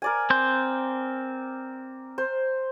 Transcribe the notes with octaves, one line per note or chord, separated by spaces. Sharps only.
A#4 D5 G#5
C4 C6 G6
C5